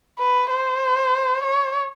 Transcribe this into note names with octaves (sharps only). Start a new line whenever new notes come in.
B4
C5
C#5